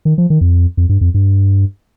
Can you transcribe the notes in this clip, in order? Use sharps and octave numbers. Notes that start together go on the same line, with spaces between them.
D#3
F3
D#3
F2
F2
G2
F2
G2